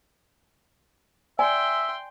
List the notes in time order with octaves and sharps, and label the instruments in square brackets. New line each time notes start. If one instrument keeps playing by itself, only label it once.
[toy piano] D5 G#5 [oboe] E5 [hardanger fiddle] G5 C6